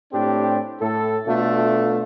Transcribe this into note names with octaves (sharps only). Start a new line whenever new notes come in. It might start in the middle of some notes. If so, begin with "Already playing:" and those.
A2 C4 D4 G4
A2 A4
B2 A3 D4 F4 A4